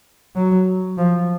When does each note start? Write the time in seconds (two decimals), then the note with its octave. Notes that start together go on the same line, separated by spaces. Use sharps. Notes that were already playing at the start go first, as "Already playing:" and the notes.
0.35 F#3
0.98 F3